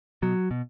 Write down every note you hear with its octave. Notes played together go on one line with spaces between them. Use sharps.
B2 F#3
B2